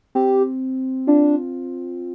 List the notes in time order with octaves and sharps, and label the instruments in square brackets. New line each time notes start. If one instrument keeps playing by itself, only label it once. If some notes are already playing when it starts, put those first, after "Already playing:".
[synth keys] C4 [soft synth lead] G4
[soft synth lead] D4 [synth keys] F4